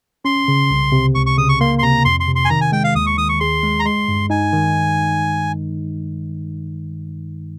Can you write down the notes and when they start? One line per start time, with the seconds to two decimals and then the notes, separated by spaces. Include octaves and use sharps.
0.25 C#4 C6
0.48 C#3
0.71 C2
0.92 C3
1.15 C#2 C#6
1.26 C#6
1.38 C#3 D#6
1.49 C#6
1.60 A#3 C6
1.79 C6
1.82 C3 A#5
2.05 F2 C6
2.20 C6
2.28 C3
2.35 C6
2.45 G#5
2.50 D#3 A#5
2.61 G#5
2.72 G#3 G5
2.84 F5
2.95 D#2 D#6
3.06 C#6
3.18 D#3 D#6
3.29 C#6
3.40 G#4 C6
3.63 G#3
3.80 A#5
3.85 G#3 C6
4.08 G2
4.30 D#4 G#5
4.53 D#3